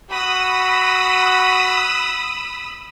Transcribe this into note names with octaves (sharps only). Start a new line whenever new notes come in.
F#4 B5 D#6 E6